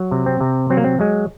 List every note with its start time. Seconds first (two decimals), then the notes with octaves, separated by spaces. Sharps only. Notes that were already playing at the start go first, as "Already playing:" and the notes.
Already playing: F#3
0.11 C3
0.26 C4
0.41 C3
0.70 F#3 C4
0.77 A#3
0.84 C4
0.99 F#3 G#3